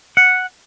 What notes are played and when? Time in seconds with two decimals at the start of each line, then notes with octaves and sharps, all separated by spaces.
0.17 F#5